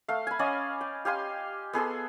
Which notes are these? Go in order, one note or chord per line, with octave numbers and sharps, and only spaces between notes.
A3 F5
G#5 B5
C#4 D5 D#5 F5
G5
G4 F5 G#5 C6
B3 G#4 A4 C6